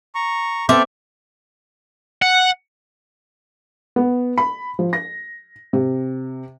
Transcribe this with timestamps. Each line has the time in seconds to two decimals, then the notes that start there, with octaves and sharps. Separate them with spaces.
0.15 A#5 C#6
0.69 B3 C4 A4 E5 D6 F6 G6
2.22 F#5
3.96 B3
4.38 B5
4.79 F3
4.93 A#6
5.73 C3